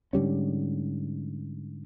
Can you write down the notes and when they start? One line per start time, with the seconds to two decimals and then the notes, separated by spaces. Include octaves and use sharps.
0.13 G#2 D3 G3 C#4